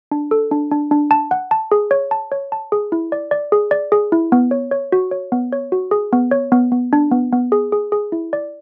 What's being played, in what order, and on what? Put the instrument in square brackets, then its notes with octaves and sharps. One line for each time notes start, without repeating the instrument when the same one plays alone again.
[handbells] D4
A4
D4
D4
D4
A5
F#5
A5
G#4
C#5
A5
C#5
A5
G#4
E4
D5
D5
G#4
D5
G#4
E4
B3
C#5
C#5
F#4
C#5
B3
C#5
F#4
G#4
B3
C#5
B3
B3
D4
B3
B3
G#4
G#4
G#4
E4
D5